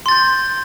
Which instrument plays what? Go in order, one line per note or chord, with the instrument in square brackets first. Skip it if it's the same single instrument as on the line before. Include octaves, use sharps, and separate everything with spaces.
[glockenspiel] C6
A6
G6